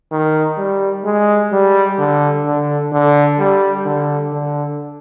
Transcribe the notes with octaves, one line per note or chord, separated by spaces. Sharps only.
D#3
G3
G#3
G3
D3
D3
D3
G3
D3
D3